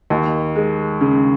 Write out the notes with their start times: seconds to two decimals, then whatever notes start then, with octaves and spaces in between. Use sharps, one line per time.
0.10 D#2
0.56 G#3
1.01 C#3